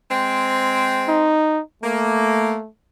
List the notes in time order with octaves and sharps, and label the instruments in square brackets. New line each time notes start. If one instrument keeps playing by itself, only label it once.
[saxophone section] G#3 C4
[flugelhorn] D#4
[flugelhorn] A3 [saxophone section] A#3